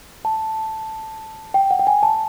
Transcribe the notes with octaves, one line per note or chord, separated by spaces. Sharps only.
A5
G5
F#5
G5
G#5
A5